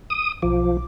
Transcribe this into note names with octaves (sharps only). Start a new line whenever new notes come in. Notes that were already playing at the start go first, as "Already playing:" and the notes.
D#6
B1 F3 D6